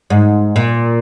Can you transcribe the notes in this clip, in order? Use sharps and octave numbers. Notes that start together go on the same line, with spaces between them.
G#2
A#2